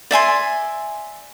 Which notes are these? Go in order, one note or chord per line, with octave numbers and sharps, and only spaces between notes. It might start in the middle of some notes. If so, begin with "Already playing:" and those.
D5 E5 G#5 C6